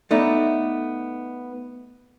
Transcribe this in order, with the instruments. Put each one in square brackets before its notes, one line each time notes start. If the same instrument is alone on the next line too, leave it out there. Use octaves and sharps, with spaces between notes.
[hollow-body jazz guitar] A3 B3 D#4 D5